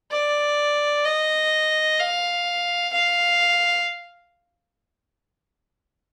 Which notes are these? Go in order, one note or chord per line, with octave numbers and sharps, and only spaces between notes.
D5
D#5
F5
F5